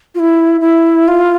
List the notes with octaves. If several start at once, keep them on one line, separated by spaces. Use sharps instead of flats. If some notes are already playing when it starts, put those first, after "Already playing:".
F4
E4
E4
F4